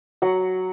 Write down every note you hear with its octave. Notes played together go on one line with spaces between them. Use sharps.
F#3 F#5